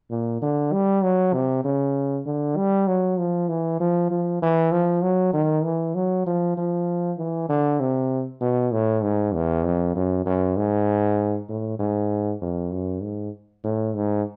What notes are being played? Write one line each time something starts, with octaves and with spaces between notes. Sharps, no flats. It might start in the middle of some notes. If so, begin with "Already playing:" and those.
A#2
D3
G3
F#3
C3
C#3
D3
G3
F#3
F3
E3
F3
F3
E3
F3
F#3
D#3
E3
F#3
F3
F3
E3
D3
C3
B2
A2
G#2
E2
F2
F#2
F#2
G#2
A2
G#2
F2
F#2
G#2
A2
G#2